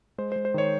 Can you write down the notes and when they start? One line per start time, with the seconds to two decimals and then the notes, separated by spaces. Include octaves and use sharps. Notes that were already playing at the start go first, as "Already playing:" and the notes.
0.18 G#3 C5
0.32 C5
0.36 G#3
0.45 C5
0.54 D#3 C#5